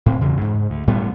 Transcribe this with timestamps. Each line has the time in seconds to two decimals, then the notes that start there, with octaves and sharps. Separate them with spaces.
0.06 A2 C4
0.21 E2 C#3
0.41 G#2
0.70 D2
0.87 A2 G3 B3